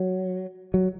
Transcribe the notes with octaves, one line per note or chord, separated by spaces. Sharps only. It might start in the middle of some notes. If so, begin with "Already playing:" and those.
Already playing: F#3
F#3